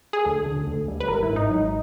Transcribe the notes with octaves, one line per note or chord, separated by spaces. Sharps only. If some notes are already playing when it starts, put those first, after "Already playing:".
G#4
D2 A4
D3
D2
G3
B4
G#1 A#4
E4
G#2
D#4
F#3